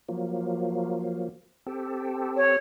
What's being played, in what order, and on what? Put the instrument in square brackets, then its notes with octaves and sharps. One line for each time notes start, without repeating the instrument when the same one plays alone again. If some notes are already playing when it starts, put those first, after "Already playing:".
[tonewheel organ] F3 F#3 A#3
C4 G4 A4
[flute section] C#5